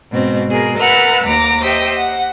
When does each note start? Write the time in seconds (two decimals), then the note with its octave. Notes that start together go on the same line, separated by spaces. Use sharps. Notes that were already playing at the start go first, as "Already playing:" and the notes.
0.12 G#2 B2 C4
0.49 B2 G#4 A#4
0.78 A#4 B4 E5 F#5 F6 A6
1.25 D#2 A#5 D6 A#6
1.61 G4 C5 D#5 E5 G5
1.94 F#5